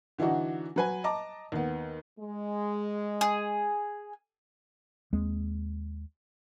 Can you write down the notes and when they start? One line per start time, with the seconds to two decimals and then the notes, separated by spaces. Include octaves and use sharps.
0.18 D3 E3 D4 D#4 F#4
0.76 F#3 B4 G#5
1.04 D#5 A5 A#5 D6
1.52 D#2 B3
2.20 G#3
3.21 G#4
5.13 D#2 G#3 C4